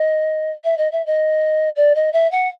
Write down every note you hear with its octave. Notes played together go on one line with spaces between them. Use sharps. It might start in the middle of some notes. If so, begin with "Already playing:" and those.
Already playing: D#5
E5
D#5
E5
D#5
D5
D#5
E5
F#5